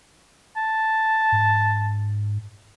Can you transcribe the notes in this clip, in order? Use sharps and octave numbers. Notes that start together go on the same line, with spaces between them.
A5
G#2